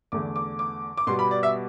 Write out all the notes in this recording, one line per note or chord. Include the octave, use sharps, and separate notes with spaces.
E2 D3 A3 D6
D6
D6
D6
B2 G3 B3 C6
B5
D5
E5